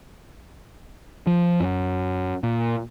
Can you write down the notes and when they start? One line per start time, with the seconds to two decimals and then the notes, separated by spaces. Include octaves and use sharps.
1.27 F3
1.60 F#2
2.43 A#2